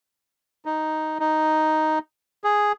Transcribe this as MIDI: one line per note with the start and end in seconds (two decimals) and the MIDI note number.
0.65 1.18 63
1.20 1.99 63
2.44 2.72 68